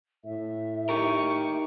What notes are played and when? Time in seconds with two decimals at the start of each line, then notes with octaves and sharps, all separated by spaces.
0.25 A2 E5
0.89 D#4 G4 A#4 C#6